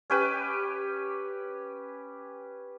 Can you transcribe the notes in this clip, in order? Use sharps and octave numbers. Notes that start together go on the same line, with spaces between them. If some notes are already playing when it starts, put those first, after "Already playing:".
C#4 G4 B4